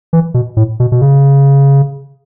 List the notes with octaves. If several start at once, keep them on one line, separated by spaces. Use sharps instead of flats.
E3
B2
A2
B2
B2
C#3